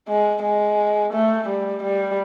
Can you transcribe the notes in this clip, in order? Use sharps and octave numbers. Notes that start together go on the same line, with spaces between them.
G#3
G#3
A3
G3
G3